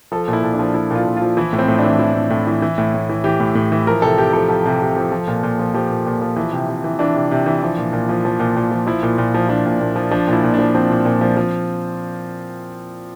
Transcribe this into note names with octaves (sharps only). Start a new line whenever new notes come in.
F3 A4
A#2
E4
A#2
D4
F3
F3 E4
A#2 F4
A#2
F4
F3
E3 E4
A2
C4
A2
D4
E3
E3 E4
A2
A2
E3
E3
A2
A2
E3
E3 G4
A2
A2
E3
F3 A#4
C3 A4
C3 G4
F3 A4
F3
C3
C3
F3
F3
A#2
A#2
F3
F3 G4
A#2
A#2
F3
E3
C3
C3
E3
E3 D4
C3
C3
E3
F3
A#2
A#2
F3
F3
A#2
A#2
F3
F3 E4
A#2
A#2
F3
F3 D4
A#2
A#2
F3
F3 D4
A#2
E4
A#2
D4
F3
F3 C4
A#2
A#2
F3
F3